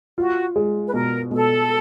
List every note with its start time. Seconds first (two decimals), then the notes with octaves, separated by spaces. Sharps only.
0.18 F4 F#4
0.56 G#3
0.86 B4
0.93 B2 A#4
1.31 B2 A4